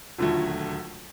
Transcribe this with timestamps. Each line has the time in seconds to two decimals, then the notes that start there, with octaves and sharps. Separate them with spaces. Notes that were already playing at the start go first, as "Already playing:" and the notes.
0.18 E1 D#2 D3 F#3 A3 F4